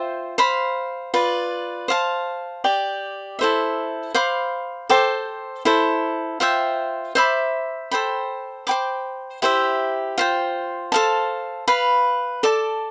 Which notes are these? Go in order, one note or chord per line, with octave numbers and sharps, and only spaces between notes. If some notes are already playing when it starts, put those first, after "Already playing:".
Already playing: F4 C5 E5 G5
C5 F5 B5
F4 B4 D5
C5 F5 A5
G4 D5 G5
E4 A4 C5 E5
C5 F5 B5 D6
A4 C5 G5 D6
E4 A4 C5
F4 C5 E5 G5
C5 E5 B5 D6
A4 C5 G5 B5
C5 G5 B5 D6
E4 G4 C5 E5
F4 C5 G5
A4 C5 F5 A5
B4 F5 B5
A4 D5 A5 D6